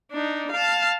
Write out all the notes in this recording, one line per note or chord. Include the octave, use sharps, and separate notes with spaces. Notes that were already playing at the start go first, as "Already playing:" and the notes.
D4 D#4
F5 A5